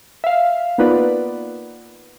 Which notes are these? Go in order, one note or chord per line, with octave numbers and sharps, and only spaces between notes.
E5 F5
A#3 B3 D#4 F4 B4 D5